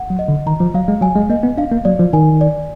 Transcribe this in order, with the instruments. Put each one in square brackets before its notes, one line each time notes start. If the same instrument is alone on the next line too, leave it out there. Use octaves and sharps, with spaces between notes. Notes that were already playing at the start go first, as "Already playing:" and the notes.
Already playing: [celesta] F#5
[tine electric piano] F#3
[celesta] D#5
[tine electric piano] D3
[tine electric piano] D#3 [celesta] A#5
[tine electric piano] F3
[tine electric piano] F#3 [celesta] F5
[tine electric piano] G#3
[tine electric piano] F#3 [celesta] G#5
[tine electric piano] G#3
[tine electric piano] A#3 [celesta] D#5
[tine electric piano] B3
[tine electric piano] D4 [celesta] F5
[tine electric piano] A#3
[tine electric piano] F#3 [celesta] D5
[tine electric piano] F3
[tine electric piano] D#3 [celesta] G#5
[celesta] D5